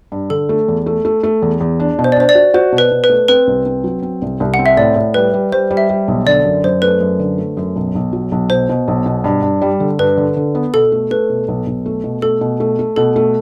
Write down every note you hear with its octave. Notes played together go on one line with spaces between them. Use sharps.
G2
D3 A4
A3
E2
A3
A3
A3
E2
E2
D4
B2
C5
D5
D4 C5
D5
F#4
F#4 C5
B2
B4
B2
B4
A3
C4 B4
C2
C4
F#3
C4
C2
C2
F#5
C4
E5
A2 D5
A2
G3 B4
G3
G3 C5
G3
E5
G3
B1
D3 D5
F#2
F#2 C5
A3 B4
F#2
D3
A3
F#2
B1
B1
F#3
B1
B2 C5
B2
B1
B2
G2
G2
G3
D3
G2 B4
D3
D3
B3
B2 A4
A3
A3 B4
B2
B1
B1
A3
B2
A3 A4
B2
A3
A3
B2 A4
A3